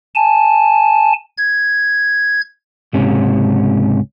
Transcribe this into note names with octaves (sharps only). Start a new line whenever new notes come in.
G#5 A5
G#6
C#2 G#2 C3 C#4